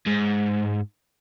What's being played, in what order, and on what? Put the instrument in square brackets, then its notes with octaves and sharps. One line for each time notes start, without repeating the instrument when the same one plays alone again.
[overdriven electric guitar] G#2